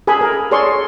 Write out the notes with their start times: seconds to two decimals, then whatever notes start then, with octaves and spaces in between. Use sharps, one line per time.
0.07 G#4 A4 G#5 B5
0.21 A#4
0.51 G#4 A4 C#5 D5 C6 C#6